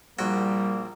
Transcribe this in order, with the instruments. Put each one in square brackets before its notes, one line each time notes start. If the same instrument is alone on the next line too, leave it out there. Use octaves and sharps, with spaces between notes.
[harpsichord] A#1 F#4 G5 [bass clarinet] G3 [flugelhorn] A#3